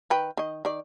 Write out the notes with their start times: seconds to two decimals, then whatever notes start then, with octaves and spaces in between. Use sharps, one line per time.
0.10 D#3 B4 G5
0.37 D#3 D#5
0.65 D#3 D5